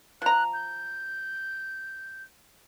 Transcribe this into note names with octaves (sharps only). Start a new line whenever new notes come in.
F3 A#5 F#6
G6